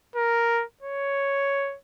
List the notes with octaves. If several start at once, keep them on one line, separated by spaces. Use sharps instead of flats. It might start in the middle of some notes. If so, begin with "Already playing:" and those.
A#4
C#5